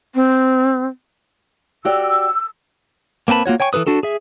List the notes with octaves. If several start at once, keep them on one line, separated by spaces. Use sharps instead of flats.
C4
F#4 G4 D5 E6
A#3 C4 B4 A5 B5
A#3 F4 F#4 C#5
C#5 G5 G#5 C#6
E3 G#4 A4 B4 D#6
D4 F#4 A4
G#4 E5